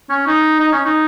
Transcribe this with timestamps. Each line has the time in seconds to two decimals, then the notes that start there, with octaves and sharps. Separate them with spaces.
0.10 C#4
0.27 D#4
0.60 D#4
0.72 C#4
0.86 D#4